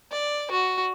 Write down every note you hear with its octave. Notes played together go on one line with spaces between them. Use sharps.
D5
F#4